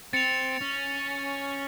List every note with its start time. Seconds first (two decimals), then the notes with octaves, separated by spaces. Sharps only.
0.13 C4 A6 C#7 F7
0.61 C#4